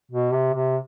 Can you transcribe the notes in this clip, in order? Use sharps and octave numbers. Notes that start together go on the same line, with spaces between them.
B2
C3
C3